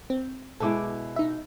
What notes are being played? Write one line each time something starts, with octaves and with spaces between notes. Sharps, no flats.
C4
B2 G#3 E4 A4 D6
D#4 E5